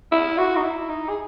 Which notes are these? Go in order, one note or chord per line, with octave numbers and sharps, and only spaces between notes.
E4
F#4
D#4
E4
D#4
G#4